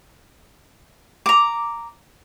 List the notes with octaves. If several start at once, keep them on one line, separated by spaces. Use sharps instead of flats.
A#5 D6